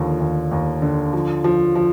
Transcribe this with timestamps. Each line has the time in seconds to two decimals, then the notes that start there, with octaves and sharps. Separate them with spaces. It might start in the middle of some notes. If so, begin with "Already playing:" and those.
Already playing: D#2 D3 F3
0.20 D#2
0.51 D#2
0.82 D3
1.13 F3
1.44 F3
1.75 F3